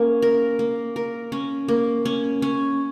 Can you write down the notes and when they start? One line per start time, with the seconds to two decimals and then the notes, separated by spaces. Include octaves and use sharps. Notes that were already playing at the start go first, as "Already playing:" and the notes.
Already playing: A#3 C#4
0.22 A#4
0.59 A#3
0.96 A#4
1.32 C#4
1.68 A#3
2.05 C#4
2.42 C#4